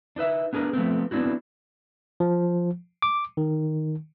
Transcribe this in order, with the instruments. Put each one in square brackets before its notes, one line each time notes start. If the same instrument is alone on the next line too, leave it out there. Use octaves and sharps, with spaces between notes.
[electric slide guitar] D4 D#4 B4 E5
B3 D4 G#4 A#4 B4
F3 A3 B3 C4
B3 C4 D4 E4 F#4
[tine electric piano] F3
D6
D#3